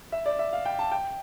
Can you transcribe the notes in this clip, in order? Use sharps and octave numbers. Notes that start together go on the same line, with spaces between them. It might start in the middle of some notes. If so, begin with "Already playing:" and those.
E5
D5
E5
F5
G5
A5
G5